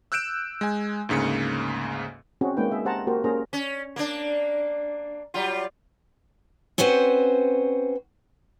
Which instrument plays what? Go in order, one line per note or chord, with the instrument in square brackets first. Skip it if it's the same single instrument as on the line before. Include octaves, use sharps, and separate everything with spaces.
[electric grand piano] E6 F#6 G6 D7 E7
G#3 G#5
D2 G#2 C#3 A#3 C#7
[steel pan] C4 C#4 F#4 G#4
G#3 A#3 C4 D#4 B4 G5
G#4 E5
G4 G#4 C5 F#5 A5 A#5
A#3 F#4 G4 A#4 C5
A#3 C#4 G#4 A#4 C5 A#5
[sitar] C#4
A#3 D4
F#3 G3 F4
[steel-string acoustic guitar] C4 C#4 F#4 B4 C5